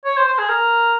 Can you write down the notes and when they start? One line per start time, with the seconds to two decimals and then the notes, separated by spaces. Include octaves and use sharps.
0.05 C#5
0.17 C5
0.27 C5
0.38 G#4
0.49 A#4